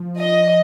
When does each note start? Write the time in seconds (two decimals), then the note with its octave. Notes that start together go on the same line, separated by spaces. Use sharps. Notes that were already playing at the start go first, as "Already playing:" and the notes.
Already playing: F3
0.19 D#5